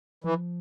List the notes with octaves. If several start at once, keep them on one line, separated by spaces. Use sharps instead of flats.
E3 F3